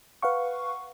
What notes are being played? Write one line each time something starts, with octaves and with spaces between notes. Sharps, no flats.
B4 F5 F#5 C#6